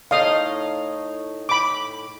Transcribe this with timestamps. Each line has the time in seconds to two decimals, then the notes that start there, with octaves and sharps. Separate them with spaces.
0.11 A2 D#4 D#5 F5 D#6
1.49 B5 D6